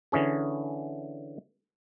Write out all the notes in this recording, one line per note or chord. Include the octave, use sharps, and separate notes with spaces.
D3 E3 C#4 G#4